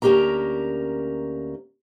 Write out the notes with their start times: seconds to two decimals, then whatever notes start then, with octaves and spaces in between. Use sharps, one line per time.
0.02 D2 A#3 C#4 G4 A#4 A#5